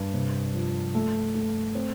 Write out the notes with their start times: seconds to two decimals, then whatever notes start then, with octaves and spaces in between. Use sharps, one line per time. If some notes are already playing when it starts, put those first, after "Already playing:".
Already playing: G2
0.14 C3
0.54 F3
0.95 A3
1.35 A3
1.75 C4